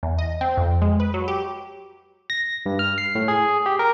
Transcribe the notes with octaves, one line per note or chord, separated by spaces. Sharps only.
E2
D#5
C4
F2
G#3
B4
F#3
G4
A#6
G2
F6
C7
A2
G#4
G4
A#4